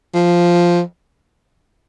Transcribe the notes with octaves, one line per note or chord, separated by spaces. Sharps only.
F3